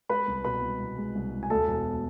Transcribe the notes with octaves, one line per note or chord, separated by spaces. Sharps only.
G#3 B4 B5
C2
B2 B4 B5
C2
C2
G#3
C2
G#3
G#5
D2 A4 A5
E1